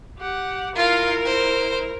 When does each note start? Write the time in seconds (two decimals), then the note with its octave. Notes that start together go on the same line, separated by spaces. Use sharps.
0.19 G4 F#5
0.76 E4 F4 A#4 F5
1.25 C5